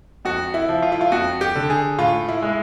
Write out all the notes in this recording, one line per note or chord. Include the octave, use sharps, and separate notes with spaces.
F2 F#4
E4
F3
F4
E4
F4
F2 F#4
G4
D3
G#4
A2 F4
E4
G#3